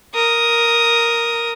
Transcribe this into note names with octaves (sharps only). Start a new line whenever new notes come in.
A#4 D#6